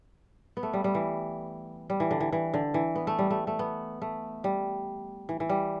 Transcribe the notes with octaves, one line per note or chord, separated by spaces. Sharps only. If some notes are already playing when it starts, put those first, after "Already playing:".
B3
A3
G3
G3
E3
G3
E3
D3
E3
E3
D3
E3
B3
A3
G3
A3
A3
B3
A3
G3
E3
E3
G3